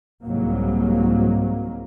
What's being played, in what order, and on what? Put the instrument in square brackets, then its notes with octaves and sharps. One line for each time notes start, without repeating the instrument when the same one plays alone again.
[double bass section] C2 G#2 F#3 A#3